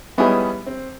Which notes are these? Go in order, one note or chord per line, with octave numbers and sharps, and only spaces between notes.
G3 B3 C#4 D#4 E4 G#4
C4